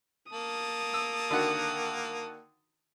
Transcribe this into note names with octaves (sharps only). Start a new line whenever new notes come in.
A#3 A5 D#6
E6
D3 D#3 F#4